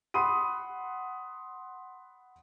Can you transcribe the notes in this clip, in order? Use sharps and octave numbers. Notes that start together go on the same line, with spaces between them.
F#5 B5 C6 D#6 D#7